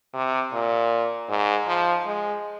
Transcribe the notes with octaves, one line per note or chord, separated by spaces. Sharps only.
C3
A#2
G#2
F3
G#3